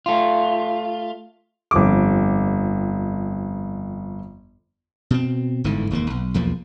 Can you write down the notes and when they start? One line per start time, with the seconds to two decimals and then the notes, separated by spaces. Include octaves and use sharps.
0.06 A3 F4
1.71 G1 F2 D6
5.11 B2 C4
5.64 G1 G#2 D3 E3
5.90 E1 D#2 F3 A#3
6.10 B1
6.34 B1 E2 F3 A#3